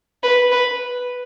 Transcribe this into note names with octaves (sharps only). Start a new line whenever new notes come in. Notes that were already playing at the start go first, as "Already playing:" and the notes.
B4
B4